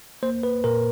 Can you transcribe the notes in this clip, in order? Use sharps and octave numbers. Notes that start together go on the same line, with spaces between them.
A#3 C5
B4
A#2 A#4